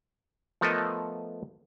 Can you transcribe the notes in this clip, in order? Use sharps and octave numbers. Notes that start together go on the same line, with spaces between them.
F3 A3 B3 A4 A#4 D#5